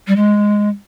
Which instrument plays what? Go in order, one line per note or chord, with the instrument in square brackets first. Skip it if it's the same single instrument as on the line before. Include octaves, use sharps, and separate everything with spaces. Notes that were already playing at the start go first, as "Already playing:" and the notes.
[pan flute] G3
G#3